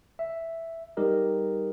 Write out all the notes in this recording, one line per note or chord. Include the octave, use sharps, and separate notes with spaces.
E5
G3 D#4 G4 A#4 D#5